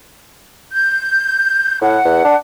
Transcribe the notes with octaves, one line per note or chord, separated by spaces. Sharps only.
G6
A2 F#5
E2
D4